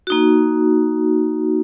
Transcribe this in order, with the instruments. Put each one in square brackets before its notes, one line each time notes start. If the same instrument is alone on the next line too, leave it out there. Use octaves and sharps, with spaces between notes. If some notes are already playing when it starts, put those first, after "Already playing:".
[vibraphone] A#3 D#4 F#4